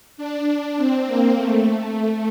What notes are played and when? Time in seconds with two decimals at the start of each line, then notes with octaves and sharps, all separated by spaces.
0.17 D4
0.77 C4
1.06 A#3
1.36 A3